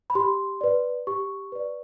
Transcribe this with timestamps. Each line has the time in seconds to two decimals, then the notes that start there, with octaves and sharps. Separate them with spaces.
0.10 B5
0.15 G4 C6
0.61 B4 D5
1.07 G4 C#6
1.52 B4 D5